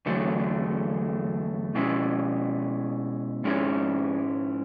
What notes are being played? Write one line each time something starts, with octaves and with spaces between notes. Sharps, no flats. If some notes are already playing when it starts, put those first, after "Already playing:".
E2 D3 F#3 A3
B2 G#3 C#4 E4
G#2 G#3 C#4 E4